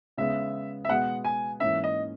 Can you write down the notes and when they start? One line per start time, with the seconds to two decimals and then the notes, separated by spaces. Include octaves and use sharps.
0.17 C#3 G#3 B3 E5
0.85 E5
0.89 B2 G#3 B3 F#5
1.24 G#5
1.60 G#2 E3 A#3 C#4 E5
1.84 D#5